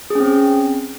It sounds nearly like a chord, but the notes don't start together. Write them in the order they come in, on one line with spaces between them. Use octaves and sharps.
G#4 C#4 C4